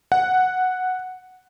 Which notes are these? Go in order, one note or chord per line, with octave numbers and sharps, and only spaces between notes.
F#5